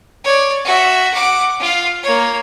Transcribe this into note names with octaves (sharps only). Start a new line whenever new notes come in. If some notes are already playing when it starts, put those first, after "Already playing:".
C#5 D5
F#4 E5
F#5 D6
F4 F5
A#3 C#5